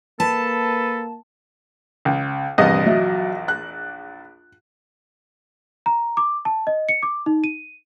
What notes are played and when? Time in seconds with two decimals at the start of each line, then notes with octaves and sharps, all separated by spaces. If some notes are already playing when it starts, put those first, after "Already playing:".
0.20 A#3 A4 B4 A5
2.05 C#2
2.58 A#1 E2 G2 C3 G4 D#5
2.86 F#3 E5
3.48 F#6
5.86 A#5
6.17 D6
6.45 A5
6.67 D#5
6.89 C#7
7.03 D6
7.26 D#4
7.44 D#7